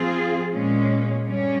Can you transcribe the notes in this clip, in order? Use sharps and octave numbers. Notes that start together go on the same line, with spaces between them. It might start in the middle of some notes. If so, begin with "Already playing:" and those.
Already playing: F3 C4 F4 G#4
A#2 G#3 C#4
G2 G3 C#4